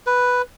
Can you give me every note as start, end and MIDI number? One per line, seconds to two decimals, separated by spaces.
0.07 0.42 71